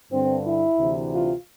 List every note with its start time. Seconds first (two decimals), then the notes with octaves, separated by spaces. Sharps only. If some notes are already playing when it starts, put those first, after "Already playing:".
0.12 G2 D3 C4
0.45 E4
0.78 D2 C3 E3
1.12 F4